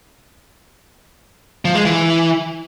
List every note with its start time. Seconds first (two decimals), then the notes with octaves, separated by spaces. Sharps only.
1.65 F3
1.75 G#3
1.85 E3